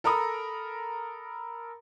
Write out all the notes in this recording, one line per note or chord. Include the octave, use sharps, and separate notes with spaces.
A4 A#4 A#5 B5 D#6